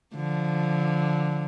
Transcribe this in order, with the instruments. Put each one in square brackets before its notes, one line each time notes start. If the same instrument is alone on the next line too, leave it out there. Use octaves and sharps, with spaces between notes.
[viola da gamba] D3 F3